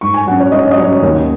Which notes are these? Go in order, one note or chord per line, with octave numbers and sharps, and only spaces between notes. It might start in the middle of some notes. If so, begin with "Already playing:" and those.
G#2 C#6
G#5
F#3 C#4 F#5
C#5
G#2 D#5
D#5
F#3 C#4 C#5
D#2